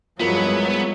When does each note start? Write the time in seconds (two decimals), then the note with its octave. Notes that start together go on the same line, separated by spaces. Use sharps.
0.20 G2 F3 F#3 G#3 B3 E4 F4 A#4